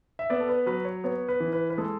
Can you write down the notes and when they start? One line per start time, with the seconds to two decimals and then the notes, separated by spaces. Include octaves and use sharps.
0.19 E5
0.30 B3 D5
0.40 A4
0.49 B4
0.66 F#3 B4
0.85 C#5
1.04 B3 C#5
1.28 B4
1.40 E3
1.53 B4
1.70 B4
1.78 G#3 A4